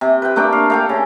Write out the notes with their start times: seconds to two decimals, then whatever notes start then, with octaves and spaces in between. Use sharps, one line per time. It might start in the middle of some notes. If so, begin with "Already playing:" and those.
0.01 C3
0.22 B4 G5
0.36 A3 A#3 D4 G5
0.52 F5
0.70 A3 F5 G5
0.89 C#3